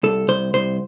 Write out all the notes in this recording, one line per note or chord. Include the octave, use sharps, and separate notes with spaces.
C2 A4
C2 C5
C2 C5